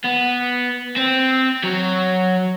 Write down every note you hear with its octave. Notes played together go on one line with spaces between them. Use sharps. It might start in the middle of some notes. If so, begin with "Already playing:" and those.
B3
C4
F#3